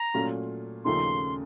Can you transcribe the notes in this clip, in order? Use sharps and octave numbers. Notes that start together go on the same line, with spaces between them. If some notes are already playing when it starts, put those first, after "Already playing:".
Already playing: A#5
A#2 F#3 A3 C#4 F4
D#2 C#3 F3 A3 D#4 C6